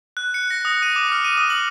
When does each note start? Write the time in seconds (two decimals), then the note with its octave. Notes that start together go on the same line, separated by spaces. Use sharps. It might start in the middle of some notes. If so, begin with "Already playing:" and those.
0.17 F#6
0.34 C#7
0.50 A#6
0.65 D#6
0.82 D#7
0.96 D6
1.12 F6
1.24 D#7
1.37 D#6
1.50 F#7